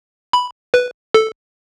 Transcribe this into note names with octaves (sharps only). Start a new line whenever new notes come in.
B5
B4
A4